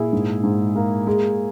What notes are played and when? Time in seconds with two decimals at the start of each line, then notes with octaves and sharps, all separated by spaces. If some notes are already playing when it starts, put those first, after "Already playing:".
Already playing: A#2 E4 G#4
0.13 G#2
0.44 G#2
0.76 A#3
1.07 G#3